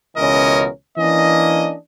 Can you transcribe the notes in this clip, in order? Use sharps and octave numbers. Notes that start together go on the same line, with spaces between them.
C#2 B2 E3 C#4 A#4 D#5
E3 A#3 C#4 D4 D#5